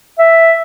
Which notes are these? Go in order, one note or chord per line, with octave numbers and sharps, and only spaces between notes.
E5